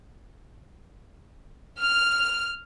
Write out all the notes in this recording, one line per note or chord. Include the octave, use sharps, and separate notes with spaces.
F6